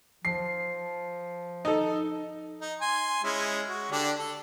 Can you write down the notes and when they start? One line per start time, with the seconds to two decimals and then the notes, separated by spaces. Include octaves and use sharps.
0.25 F3 C7
1.65 D#4 A4
2.61 D#4
2.81 G#5 C6
3.24 G#3 C#4 E4
3.69 F#4
3.91 D3 D4 G4
4.18 A4